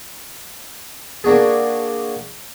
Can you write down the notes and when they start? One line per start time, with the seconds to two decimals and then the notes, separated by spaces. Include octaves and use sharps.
1.24 A#3 D4 F#4 G#4